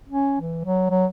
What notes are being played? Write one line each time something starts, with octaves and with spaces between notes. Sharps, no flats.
C#4
E3
F#3
F#3